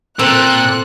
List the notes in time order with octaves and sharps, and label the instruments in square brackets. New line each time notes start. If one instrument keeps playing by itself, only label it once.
[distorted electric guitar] A#2 [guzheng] C4 [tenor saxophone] A4 [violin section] F#6